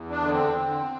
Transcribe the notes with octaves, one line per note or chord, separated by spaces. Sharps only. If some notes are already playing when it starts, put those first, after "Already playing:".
Already playing: E2
D4
D3 B3
C4
D3